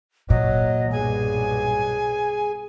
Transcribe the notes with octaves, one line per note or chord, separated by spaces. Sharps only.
A#2 F#3 D#5
B1 G2 G#4 G#5